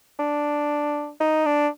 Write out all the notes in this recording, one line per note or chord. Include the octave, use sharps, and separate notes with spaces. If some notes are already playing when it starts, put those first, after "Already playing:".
D4
D#4
D4